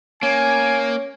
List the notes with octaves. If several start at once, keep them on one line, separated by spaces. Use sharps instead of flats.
A#3 C#4 G#5